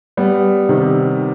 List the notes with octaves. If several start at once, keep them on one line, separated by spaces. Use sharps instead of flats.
G3 B3
C3 D#3